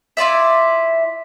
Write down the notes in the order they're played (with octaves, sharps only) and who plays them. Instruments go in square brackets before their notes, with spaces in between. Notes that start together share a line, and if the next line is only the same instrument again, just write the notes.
[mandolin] E4 F4 D5 E5